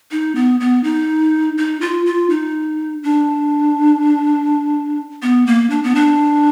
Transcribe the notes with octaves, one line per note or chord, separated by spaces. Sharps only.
D#4
B3
B3
D#4
D#4
F4
F4
D#4
D4
B3
A#3
D4
B3
D4